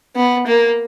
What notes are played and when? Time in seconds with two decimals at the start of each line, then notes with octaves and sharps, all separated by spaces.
0.16 B3
0.47 A#3